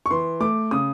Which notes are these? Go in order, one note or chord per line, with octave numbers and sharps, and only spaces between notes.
C#6
E3 C6
A3 D6
C#3 D#6